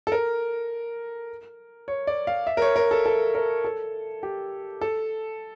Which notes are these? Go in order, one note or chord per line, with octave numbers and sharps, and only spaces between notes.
A4
A#4
C#5
D5
F5
E5
A#4
C#5
A#4
A4
A4
A#4
A4
G4
A4